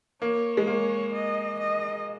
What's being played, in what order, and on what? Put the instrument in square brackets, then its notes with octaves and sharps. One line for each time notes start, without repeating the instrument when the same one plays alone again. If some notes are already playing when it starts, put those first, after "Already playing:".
[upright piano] A#3 [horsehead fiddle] C#5
[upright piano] G#3
[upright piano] A#3 [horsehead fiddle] C#5
[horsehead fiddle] D#5
D#5